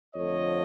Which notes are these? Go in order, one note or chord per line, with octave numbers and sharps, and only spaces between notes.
F2 D3 F3 A3 C#5 D#5